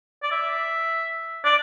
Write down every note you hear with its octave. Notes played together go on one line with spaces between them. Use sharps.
D5
E5
D5